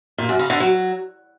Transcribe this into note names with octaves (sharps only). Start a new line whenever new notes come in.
A#2
F#2
C#3
D3
F#3